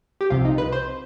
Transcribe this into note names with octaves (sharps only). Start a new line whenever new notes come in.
G4
C2 C3 F3 F4
D#4
B4
C5